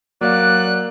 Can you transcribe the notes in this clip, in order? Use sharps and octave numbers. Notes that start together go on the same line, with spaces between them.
F#3 A#3 D5 F5 F#6